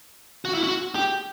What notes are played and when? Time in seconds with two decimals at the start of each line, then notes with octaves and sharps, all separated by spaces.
0.45 F#4
0.55 E4
0.64 F#4
0.95 G4